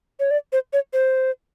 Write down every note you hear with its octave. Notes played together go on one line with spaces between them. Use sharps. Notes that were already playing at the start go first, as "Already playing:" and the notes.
C#5
D5
C5
C#5
C5